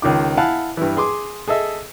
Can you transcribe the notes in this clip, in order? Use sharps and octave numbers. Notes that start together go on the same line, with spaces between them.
C#2 D#3 F4 D6
E4 F5 F#5 G#5 A5
G2 E3
G#4 C6 D6
G#4 A4 D#5 E5